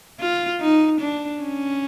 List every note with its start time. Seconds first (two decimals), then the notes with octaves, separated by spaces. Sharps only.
0.20 F4
0.61 D#4
1.01 D4
1.42 C#4